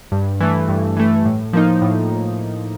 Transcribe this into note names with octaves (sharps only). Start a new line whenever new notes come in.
G2
E3 A3
G2
E3 A3
A2
F3 A#3 D#4
A2